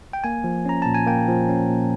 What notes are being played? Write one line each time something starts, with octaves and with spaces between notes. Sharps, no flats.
G5
A#3 G#5
F3
C#4 A#5
A#2 A5
G#5
A#3 G5
F3
C#4
A#2